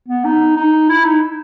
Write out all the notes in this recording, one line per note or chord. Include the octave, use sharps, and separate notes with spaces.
B3
D#4
D#4
E4
D#4